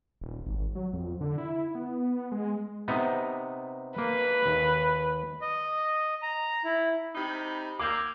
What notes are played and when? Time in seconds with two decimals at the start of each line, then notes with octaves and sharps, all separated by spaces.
0.21 D#1
0.46 G#1
0.75 F#3
0.93 F2
1.21 D3
1.38 E4
1.75 B3
2.32 G#3
2.88 C3 B3 D#4
3.98 A#3 B4
4.46 D#2
5.41 D#5
6.22 A#5
6.64 E4
7.15 C3 D#4 B5
7.79 A#3 D6 E6 G6 G#6